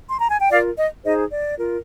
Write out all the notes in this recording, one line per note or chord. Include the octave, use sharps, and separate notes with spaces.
C6
A#5
G#5
G5
F4 A#4 D5 F5
D#5
D#4 G#4 C5 D#5
D5
F4 A#4